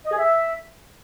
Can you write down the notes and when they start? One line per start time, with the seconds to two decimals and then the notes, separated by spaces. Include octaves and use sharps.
0.05 D#5
0.11 G#4
0.18 E5